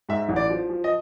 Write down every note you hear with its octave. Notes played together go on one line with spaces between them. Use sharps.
G#2 E5
A1
D5
F3
F3
D#5